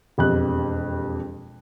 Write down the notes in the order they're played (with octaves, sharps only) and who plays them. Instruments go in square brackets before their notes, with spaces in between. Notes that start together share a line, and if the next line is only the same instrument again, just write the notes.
[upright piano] E1 F2 G4 F#6